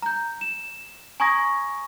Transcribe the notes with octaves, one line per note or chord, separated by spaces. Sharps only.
A#5 G6
E7
G#5 A#5 C#6 D#6 G#6 A#6